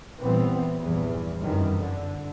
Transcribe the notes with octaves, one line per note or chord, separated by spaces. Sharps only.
A#2 E3 G3 B3 C4
A#1 E2 G2
G1 F#2 C3 D#3 E3 G3
D3